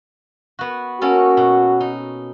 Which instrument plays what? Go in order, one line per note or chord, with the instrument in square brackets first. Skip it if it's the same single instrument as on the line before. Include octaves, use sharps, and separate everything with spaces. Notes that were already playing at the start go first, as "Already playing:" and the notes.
[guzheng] B3 F#4
[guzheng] A#3 C#4 A4 [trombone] F#4
[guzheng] B2
D#4